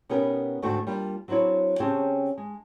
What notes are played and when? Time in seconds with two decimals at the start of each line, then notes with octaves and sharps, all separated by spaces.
0.09 B2 B3 C#4 D#4 G4 A#4
0.62 D2 G#2 A3 C4 D4 F#4
0.87 G3 A#3 D4 F4
1.28 F#3 C4 D4 E4 C#5
1.80 C#3 C4 C#4 G4 G#4 A5
2.38 G#3